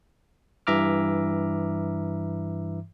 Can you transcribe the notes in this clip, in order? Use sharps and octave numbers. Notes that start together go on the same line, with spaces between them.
G2 E3 E5 A#5 D6 F6